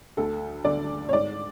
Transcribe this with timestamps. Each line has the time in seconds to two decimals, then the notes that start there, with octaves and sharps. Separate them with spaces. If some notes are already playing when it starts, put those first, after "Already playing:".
0.17 D2 A4
0.65 D3 D5
1.09 C#5
1.13 G#2 D5